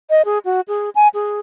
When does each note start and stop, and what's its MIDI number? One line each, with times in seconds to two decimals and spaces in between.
0.10 0.22 75
0.25 0.39 68
0.45 0.61 66
0.68 0.90 68
0.95 1.08 80
1.14 1.40 68